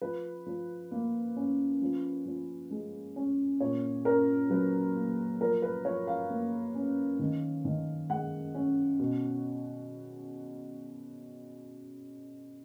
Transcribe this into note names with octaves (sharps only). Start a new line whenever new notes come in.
F3 B4
F3
A#3
C#4
F3
F3
G#3
C#4
A#2 C#5
C#4 A#4
F#3 B4
A#3
F3 A#4
B4
F3 C#5
F5
A#3
C#4
D#3
D#3
G#3 F#5
C#4
B2